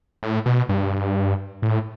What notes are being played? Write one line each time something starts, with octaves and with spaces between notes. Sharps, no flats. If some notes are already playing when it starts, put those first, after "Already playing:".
A2
B2
G2
A2